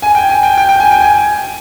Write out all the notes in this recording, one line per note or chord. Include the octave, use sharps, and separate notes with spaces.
G#5
G5
G#5
G5
G5
G5
G#5
G5
G#5